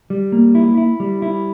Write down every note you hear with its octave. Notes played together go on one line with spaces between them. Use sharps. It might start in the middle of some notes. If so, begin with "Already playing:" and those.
G3
A#3
E4
E4
G3
E4